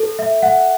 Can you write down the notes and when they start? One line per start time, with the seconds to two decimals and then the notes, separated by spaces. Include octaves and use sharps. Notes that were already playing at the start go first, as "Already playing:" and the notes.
Already playing: A4
0.19 E5
0.42 F#5